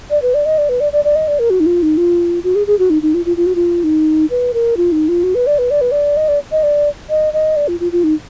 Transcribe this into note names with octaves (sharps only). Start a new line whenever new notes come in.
D5
B4
D5
D#5
D5
B4
D5
D5
D5
D#5
D5
A#4
F#4
D#4
F4
D#4
F4
F#4
G#4
G#4
F#4
D#4
D#4
F4
F4
F4
F#4
F4
D#4
B4
A#4
F4
D#4
F4
F#4
B4
D5
B4
D5
B4
D5
D#5
D5
D#5
D5
D#5
D#5
D5
F4
F4
F4
D#4